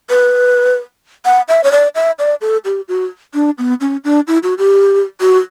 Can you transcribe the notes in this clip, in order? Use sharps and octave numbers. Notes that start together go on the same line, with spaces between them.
B4
F#5
E5
C#5
D5
E5
D5
A4
G4
F#4
D4
B3
C#4
D4
E4
F#4
G4
F#4